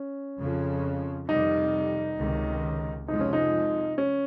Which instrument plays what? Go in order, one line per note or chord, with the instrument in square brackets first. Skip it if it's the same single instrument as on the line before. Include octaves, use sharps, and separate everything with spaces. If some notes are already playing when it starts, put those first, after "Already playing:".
Already playing: [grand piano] C#4
[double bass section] F2 C#3 F3
[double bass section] F2 C3 D#3 G3 [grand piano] D#4
[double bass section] C#2 C3 D#3
[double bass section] F2 C3 F3 G#3 [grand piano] D#4
[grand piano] C#4
D#4
C#4